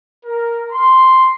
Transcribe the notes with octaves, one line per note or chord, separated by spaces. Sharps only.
A#4
C6